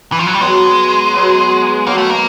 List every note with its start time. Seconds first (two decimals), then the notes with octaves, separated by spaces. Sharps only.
0.12 E3
0.19 F3
0.27 F#3
0.34 G3
0.40 B2 F#3 G#3 B3
1.13 B2 F#3 B3
1.86 D#3 F#3 A#3 B3
1.98 A3
2.10 A#3